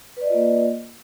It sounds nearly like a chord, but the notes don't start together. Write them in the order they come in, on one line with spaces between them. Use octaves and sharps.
B4 D5 D#5 F4 A#3